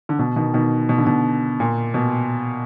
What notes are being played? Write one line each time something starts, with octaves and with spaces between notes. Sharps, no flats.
D3
B2
B2 D#3
B2 D#3
B2
D3
B2
A#2
B2